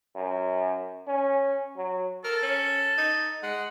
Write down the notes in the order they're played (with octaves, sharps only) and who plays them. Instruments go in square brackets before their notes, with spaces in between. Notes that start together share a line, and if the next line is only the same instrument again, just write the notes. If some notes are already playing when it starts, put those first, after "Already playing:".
[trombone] F#2
C#4
F#3
[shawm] A4 [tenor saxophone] A#4
[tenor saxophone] C#4
D#4
[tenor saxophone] G#3 [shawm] F#5